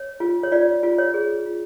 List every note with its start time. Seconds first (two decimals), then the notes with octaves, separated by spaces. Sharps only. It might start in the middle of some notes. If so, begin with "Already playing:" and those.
Already playing: C#5
0.20 F4
0.43 C#5
0.51 F4 D5
0.83 F4
0.98 C#5
1.14 G#4
1.46 F4